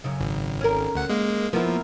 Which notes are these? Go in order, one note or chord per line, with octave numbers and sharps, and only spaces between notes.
F#2 C#3
G#1
C#4 A#4
D2 F#5
G#3 A#3
F3 A#3 B3 E4